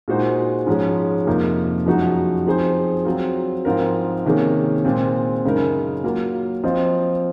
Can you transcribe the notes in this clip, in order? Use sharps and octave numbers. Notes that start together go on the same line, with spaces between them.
A#2 G#3 D#4 F#4 C5
G#2 F3 G#3 C#4 G#4
F2 C3 F3 A#3 D#4
F#2 F3 G#3 D#4 F#4
F3 C4 D#4 G#4 C5
F#3 C4 F4
G#2 F3 C4 F4 A#4
C3 D#3 A#3 C#4 G#4
A#2 G#3 C4 F4
F#2 C#3 G#3 D#4 A#4
F#3 A#3 F4
F3 C4 F4 C5 D#5